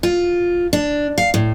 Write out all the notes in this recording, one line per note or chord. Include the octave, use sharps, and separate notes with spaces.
F4
D4
F5
A2